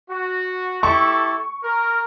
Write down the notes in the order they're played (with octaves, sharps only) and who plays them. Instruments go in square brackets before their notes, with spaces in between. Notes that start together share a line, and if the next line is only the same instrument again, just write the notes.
[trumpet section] F#4
[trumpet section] E4 G4 A4 [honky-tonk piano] C#6
[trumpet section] A#4